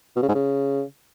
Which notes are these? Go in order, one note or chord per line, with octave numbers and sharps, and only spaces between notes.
B2
C#3
G#2
C#3